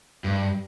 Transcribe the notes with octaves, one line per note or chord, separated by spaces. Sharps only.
G2